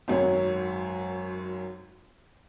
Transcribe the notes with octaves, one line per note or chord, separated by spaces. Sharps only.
G#1 F#2 F#3 C#5